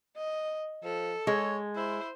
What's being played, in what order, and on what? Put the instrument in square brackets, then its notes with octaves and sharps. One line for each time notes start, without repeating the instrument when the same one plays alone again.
[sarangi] D#5
[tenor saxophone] F3 [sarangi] A4
[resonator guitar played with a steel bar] G#3 [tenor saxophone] C#5
[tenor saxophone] E4 [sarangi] C5